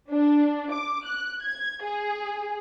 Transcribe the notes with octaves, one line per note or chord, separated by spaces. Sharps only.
D4
D6
F#6
G#6
G#4